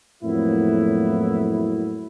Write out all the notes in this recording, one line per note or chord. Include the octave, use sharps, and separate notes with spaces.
F2 A2 F#3 A#3 B3 E4